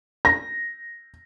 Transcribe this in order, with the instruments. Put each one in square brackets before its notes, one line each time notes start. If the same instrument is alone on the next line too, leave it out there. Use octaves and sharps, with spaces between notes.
[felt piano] A#6